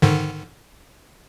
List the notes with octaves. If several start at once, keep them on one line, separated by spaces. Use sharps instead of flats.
G#2 D3 D#3